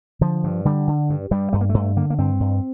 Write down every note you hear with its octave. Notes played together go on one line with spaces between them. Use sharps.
D3 F3
G2
D3 G3
D3
G2
G2 G3
G2 A3
A#3
G2 A3
D3 A#3
A#3
G2 C4
G2